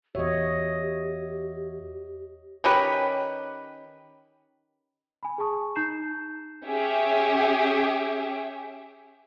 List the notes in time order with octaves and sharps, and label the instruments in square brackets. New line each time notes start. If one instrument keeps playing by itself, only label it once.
[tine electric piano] E2 F#4 E5 [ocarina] G4 [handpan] C#5 D#5
[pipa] D#3 C#4 G4 B4
[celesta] G#5 B5
G#4 G#5 A5 C#6 D#6
D#4 A#5 G6 C7 E7
[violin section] C#4 G4 G#4 E5